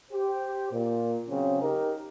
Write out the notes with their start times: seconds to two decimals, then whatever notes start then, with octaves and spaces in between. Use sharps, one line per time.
0.12 G4 C5
0.72 A#2
1.28 C#3 F#3 C4 C#4
1.62 D#4 G4 A#4